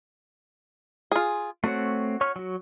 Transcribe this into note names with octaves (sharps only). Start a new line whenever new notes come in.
F4 G#4
A3 C4 F#4 C#5
C#5 C#6 F6
F#3 F#4